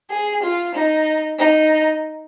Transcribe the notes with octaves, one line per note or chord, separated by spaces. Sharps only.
G#4
F4
D#4
D#4